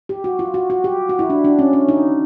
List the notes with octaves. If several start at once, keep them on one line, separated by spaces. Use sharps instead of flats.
G4
F#4
F4
F#4
F#4
G4
F#4
E4
D4
D4
C#4
C#4
D#4